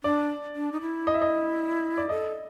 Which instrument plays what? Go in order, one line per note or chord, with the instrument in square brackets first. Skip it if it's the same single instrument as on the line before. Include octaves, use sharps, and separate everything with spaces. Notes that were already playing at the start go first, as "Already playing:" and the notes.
[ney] D4 [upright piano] D5
[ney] D4
D#4
E4
[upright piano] D#5
E5
D#5
D5
[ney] A4 [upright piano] D#5